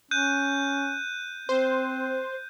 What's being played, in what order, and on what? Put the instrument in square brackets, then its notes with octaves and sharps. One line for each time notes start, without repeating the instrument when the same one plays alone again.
[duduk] C#4 [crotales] F#6 G6 D#7
[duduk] C4 [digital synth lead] C5